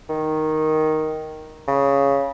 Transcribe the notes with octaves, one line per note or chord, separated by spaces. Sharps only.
D#3
C#3